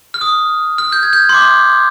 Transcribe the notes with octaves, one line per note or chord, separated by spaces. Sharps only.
F6
D#6
F6
G6
G#6
G6
C6
D6